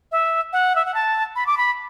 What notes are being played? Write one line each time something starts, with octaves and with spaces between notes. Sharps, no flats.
E5
F#5
E5
F#5
A5
B5
D6
B5